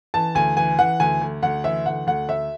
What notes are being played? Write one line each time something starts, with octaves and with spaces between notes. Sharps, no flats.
E3 A5
D2 G#5
E3 G#5
E3 F#5
D2 G#5
D2
D2 F#5
E3 E5
D2 F#5
D2 F#5
D2 E5